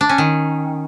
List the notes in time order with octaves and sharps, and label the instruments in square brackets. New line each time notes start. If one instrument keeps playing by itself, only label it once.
[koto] D4
C#4
D#3